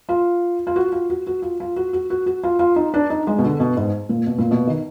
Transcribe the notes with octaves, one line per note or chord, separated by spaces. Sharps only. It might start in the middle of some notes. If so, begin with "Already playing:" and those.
F4
F4
F#4
F4
F#4
F#4
F4
F4
F#4
F#4
F#4
F#4
F4
F4
D#4
D4
D#4
G#3
B2
D3
B2
G#2
A#2
B2
A#2
B2
D#3